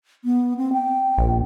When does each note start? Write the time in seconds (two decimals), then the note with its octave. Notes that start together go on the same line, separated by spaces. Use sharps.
0.24 B3
0.57 C4
0.73 G5
1.18 A#1